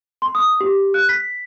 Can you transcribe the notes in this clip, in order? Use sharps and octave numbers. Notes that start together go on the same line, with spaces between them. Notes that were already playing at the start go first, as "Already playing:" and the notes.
C6
D#6
G4
F#6
B6